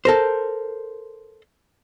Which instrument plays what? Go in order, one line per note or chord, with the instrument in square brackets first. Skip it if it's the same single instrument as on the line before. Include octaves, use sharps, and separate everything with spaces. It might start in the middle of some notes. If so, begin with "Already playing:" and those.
[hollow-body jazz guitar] A4 A#4 C5